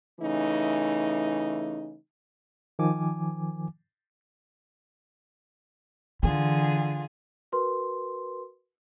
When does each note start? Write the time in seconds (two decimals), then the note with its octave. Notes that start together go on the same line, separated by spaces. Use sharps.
0.21 C#3 E3 A3 D#4
2.79 D#3 F3 G#5 D6
6.23 D3 E3 F4 G#4
7.52 F#4 A#4 B4 C6